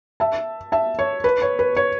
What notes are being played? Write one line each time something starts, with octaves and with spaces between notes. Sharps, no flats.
E5 A5
E5 A5
C#5
B4
C#5
B4
C#5